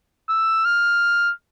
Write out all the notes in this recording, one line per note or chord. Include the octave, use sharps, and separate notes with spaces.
E6
F6